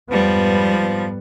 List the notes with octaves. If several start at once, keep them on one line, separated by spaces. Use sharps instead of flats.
F2 G#2 F3 G3 B3